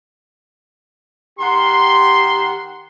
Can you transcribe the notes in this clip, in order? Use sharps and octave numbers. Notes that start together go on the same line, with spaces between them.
D#3 G4 F#5 C6